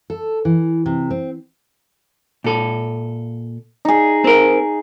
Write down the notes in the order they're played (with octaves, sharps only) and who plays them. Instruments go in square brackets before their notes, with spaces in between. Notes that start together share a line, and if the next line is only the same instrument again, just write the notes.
[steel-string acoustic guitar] A4
E3
C3
C4
[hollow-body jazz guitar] A#2 A4
[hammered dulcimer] D#4 G#4
[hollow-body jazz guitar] C4 A#4